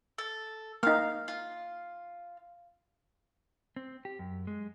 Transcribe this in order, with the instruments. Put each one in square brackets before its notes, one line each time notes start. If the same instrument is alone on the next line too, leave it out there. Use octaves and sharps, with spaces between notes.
[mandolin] A4
[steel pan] A#3 D#4 [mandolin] F5
[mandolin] F4
[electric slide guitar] C4
G4
F#2
G#3